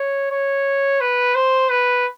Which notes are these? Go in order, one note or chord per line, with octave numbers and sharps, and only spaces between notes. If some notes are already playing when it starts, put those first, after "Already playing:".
Already playing: C#5
C#5
B4
C5
B4